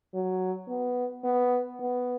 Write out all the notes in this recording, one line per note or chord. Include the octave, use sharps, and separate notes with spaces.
F#3
B3
B3
B3